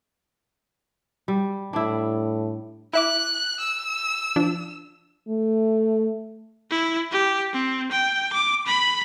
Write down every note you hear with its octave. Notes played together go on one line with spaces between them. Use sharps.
G3
A2 D4 E4
E4 E5 D6 F#6
E6
F3 D4
A3
E4
G4
C4
G5
D6
B5